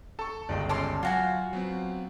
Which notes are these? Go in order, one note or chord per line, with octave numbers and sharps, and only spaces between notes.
A4 A5 C#6
G1 C#2 D5 D#5 G5
C#4 A4 D5 C6
F#3 F4 F#4 F5 G#5
F#3 B3 C4